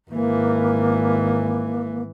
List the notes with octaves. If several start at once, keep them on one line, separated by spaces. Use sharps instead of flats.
G#1 E3 A#3